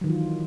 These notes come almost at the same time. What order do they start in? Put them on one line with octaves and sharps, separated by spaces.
F#3 D#3 E3 F4